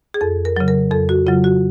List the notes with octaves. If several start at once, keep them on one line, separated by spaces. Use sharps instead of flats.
G#4
F2 A4
A#4
C#3 F#3
A#4
F2 A4
F#4
C#3 F#3 F4
F#4